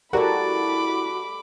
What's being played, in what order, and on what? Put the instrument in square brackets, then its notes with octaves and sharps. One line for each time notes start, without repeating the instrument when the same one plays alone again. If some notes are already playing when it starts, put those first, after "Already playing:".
[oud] E4 A#4 [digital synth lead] F#4 [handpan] G4 A4 D5 [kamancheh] B5 D6